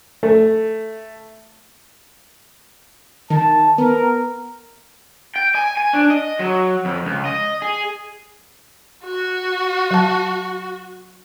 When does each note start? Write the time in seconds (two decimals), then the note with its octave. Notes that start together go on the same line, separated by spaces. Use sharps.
0.23 A3
3.30 D#3 A5
3.78 B3 A#4
5.36 G5
5.55 G#5
5.77 G#5
5.94 D4
6.11 D#5
6.39 F#3
6.85 F2
7.05 C#2
7.26 D#5
7.62 G#4
9.05 F#4
9.91 F#3 A5